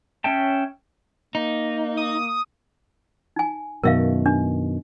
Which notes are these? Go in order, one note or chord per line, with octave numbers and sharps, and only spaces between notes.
C#4 C#5 E5 G5 A5
A#3 D#4
D#6
D#4 G#5
F#2 B2 D#3 A#4 E5 F5
D4